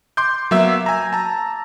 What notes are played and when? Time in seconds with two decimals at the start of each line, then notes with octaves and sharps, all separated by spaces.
0.17 C6 D6 G6
0.51 F#3 A#3 B3 E5 E6
0.86 G#5 A#5
1.13 A5 A#5